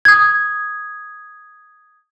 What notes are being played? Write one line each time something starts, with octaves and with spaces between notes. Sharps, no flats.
D#6 G#6